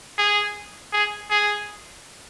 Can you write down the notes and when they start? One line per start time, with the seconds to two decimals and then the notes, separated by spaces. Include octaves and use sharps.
0.18 G#4
0.93 G#4
1.31 G#4